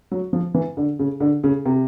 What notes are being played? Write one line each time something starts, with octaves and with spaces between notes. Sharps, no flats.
F#3
F3
E3
D3
C#3
D3
C#3
C3